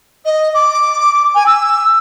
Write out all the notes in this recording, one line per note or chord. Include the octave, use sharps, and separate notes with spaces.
D#5
D6
G#5
E6